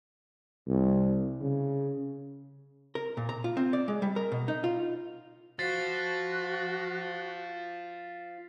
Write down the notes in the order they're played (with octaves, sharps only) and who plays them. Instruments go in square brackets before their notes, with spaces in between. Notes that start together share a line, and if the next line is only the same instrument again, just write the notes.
[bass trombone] C2
C#3
[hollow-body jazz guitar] A#4
A#2
A#5
F4
C4
D5
G#3
G3
A#4
B2
D#4
F4
[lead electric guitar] F4 C5 [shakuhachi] F#4 [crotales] A6 B6 C7